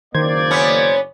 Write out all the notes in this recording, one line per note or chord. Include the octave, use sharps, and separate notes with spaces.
F#1 D#3 A#3 C5 D5 G#6
B3 C#4